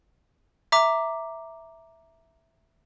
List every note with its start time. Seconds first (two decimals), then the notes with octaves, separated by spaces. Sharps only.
0.72 E5 A#5 D6